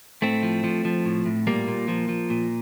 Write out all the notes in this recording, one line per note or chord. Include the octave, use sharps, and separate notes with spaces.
A2 A3 C4
F3
F3
F3
A2
A2
A#2 G3 A#3
A#2
F3
F3
A#2